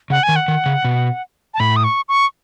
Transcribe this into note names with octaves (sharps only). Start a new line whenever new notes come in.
C#3 F#5
G#5
D#3
F#5
D#3
C#3
B2
A5
A2 B5
D#6
C#6
C#6